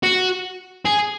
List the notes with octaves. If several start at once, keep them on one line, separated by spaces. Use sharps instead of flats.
F#4
G#4